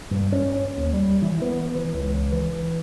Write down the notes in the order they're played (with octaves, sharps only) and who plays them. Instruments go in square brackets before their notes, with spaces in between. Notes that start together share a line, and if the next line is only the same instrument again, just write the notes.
[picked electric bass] G2
C#4
D#2
G3
E3
B3
E3
C#2
E3